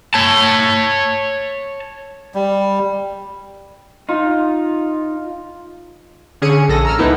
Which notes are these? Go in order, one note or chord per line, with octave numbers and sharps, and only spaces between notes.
C#5 A5
G3
D#4 F4
D3 C#4 G#4 C#7 D#7
A#1 A4 A#6
A#5 E6 F6
C#2 A#3 B3 D#4 E4 C#7